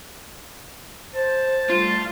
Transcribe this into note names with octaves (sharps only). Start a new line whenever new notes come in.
C5 A5
G3 A3 F4